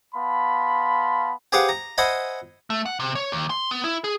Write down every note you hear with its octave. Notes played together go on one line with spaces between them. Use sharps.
B3 F5 A5 B5 C6
G4 G#4 B4 C5 F5 F#5
A#5
C5 D#5 E5 F#5 G#5 B5
A3
F#5
C3
C#5
D#2
C6
B3
E4
G#4